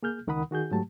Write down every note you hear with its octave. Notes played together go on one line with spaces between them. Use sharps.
A#3 G#4 F6 G6
C#2 D#3 A#4 F#5 B5 D#6
D#3 F#4 G#4 G6
G#2 F#3 A3 G4 A5